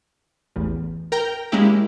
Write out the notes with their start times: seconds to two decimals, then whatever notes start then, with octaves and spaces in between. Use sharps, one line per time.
0.56 A1 E2
1.12 A#4 G5 A#5
1.52 G#3 A#3 C#4 E4 G4